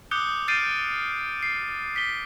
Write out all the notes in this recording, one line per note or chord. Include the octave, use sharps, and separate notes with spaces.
D6 D#6 F#6 G6 C#7 G7
F6 G6 A6 C7 D7 D#7
C7
B6 G7